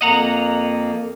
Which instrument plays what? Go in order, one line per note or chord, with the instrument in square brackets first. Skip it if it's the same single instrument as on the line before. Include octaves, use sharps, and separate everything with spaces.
[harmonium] F2 A#3 [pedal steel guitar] D#5 F#5 A#5